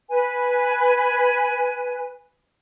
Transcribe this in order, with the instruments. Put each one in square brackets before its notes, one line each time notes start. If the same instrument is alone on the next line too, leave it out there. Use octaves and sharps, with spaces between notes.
[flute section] B4 G#5